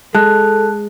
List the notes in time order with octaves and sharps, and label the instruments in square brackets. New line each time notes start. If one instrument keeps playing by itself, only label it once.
[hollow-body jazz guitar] G#3 [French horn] A4 [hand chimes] A5 F#6